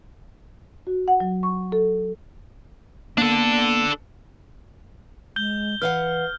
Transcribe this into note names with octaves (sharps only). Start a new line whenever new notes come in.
F#4
F#5
F#3
C#6
A4
A#3 B3 D4 A4
G#3 G6 G7
E3 B4 F5 F#5 F6